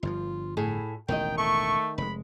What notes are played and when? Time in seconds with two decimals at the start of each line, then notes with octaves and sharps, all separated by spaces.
0.03 G1 G2 F3 F4
0.57 A2 E4 G#4
1.08 E1 A1 D#3 D#5 G5
1.38 A3 C#6
1.98 F1 G#3 B5